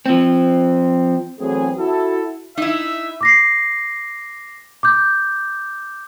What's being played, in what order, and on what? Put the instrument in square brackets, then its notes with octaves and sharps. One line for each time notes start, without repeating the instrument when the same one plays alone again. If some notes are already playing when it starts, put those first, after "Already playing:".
[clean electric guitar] F3 C4
[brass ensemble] E2 E3 F#3 A3 C4 G#4
E4 F#4 A4
[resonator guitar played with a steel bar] D#4 E4 [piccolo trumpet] E5
[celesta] D6 A#6 C7
D6 G6